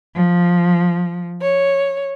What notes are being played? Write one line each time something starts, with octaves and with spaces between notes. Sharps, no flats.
F3
C#5